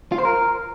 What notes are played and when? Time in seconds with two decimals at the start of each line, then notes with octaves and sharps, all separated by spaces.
0.12 F4
0.18 C5
0.25 A#4